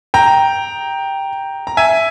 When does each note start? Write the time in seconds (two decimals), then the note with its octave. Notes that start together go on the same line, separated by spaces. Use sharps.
0.14 G5 A#5
1.67 A#5
1.77 E5 G#5